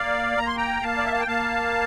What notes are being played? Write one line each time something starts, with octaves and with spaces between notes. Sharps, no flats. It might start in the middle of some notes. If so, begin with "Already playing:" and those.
Already playing: A#3 D5 F5
A#3 A#5
C6
G5 A#5
A#3 F5 A5
D5
E5
F5
G5
A#3 F5 A5